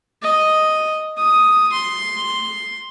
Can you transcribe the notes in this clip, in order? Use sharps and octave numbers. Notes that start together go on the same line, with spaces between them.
D#5
D#6
C6